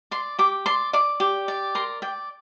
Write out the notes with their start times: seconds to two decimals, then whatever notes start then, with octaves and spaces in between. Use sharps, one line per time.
0.11 D5 C6
0.39 G4 D6
0.66 D5 C6
0.93 D5 D6
1.20 G4
1.48 D5
1.75 A#4 C6
2.02 D5 G5